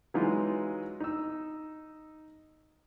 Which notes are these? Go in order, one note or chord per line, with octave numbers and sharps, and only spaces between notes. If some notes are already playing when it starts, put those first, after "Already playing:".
E3 F#3 G#3 D#4 F4
D#4 E6